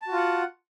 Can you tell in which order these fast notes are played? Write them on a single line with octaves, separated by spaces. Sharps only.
A5 F#4 F4 F#5